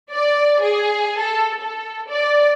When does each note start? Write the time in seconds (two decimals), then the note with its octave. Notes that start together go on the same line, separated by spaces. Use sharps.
0.11 D5
0.61 G#4
1.18 A4
1.59 A4
2.10 D5